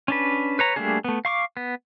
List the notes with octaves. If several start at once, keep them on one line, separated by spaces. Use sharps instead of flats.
C#4 D4 B4
B4 C#5 A#5
G3 A3 A#3 D4 G#4
A3 B3
F5 C#6 D6
B3